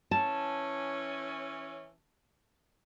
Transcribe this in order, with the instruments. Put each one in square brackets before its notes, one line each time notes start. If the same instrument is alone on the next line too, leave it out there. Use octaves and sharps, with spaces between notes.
[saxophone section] E3 C#4 [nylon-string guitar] A5